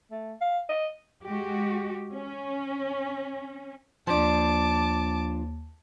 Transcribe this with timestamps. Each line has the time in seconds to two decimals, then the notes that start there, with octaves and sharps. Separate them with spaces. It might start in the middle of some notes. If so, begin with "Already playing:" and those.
0.11 A3
0.41 F5
0.69 D#5
1.25 G#3 F#4 G4
2.12 C#4
4.07 D#2 F3 D4 A5 D6